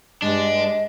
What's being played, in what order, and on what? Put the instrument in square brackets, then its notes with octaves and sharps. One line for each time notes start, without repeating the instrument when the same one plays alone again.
[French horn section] G2 [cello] G#3 [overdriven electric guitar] D4 [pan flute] D#5